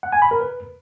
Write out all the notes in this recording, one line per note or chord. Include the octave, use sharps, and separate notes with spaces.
F#5
G#5
B5
A#4
B4